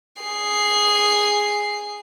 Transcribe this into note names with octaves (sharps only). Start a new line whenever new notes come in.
G#4 C7